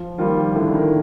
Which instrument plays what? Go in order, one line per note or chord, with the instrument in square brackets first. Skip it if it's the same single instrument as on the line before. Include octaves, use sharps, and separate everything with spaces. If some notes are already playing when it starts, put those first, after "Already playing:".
Already playing: [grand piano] F3
[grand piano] D#3 [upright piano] G3 A#3 F4
[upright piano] A2 [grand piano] D3
[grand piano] D#3